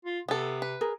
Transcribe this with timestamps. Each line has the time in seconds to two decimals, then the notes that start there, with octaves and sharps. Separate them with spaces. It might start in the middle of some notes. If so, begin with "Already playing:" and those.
0.05 F4
0.28 C3 B3 A4
0.62 B4
0.81 G#4 A#4